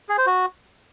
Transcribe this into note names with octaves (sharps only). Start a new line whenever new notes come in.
G#4
C5
F#4